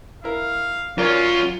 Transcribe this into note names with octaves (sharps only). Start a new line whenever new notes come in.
E4 A#4 F5
F#2 C#4 F4 A#4 C#5 D5